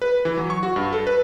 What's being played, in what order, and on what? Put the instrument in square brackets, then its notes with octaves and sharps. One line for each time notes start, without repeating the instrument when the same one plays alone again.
[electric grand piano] B4
E3
F#3
C#6
F#4
G2
A4
B4